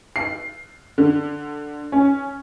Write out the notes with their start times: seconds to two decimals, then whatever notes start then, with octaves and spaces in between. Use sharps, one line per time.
0.16 C7
0.98 D3
1.92 C#4